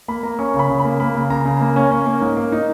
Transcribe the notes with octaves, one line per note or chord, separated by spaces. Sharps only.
A#3 B5
A#3 A#5
C#4 C#6
C#3
B5
C#3
B5
A#3
A#3 B5
C#3
C#3 A#5
C#3
A#3
C#4
C#4
A#3
G#2
A#3
D#4